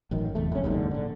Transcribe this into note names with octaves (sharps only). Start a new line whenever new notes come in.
A1 F#2 D#3
F1 E2 A3
F#1 C#4
F#1 D#2 G#2 D3
A#1 D3